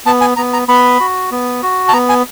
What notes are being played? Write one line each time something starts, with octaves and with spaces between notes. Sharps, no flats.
B3 A5
G#5
B3 A#5
A#5
B3 B5
F#4
B3
F#4
A5
B3 A#5
G#5